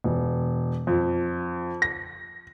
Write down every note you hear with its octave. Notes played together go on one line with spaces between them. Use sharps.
E1
F2
A#6